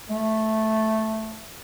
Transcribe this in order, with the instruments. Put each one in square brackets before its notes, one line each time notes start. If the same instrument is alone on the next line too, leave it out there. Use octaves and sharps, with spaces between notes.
[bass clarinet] A3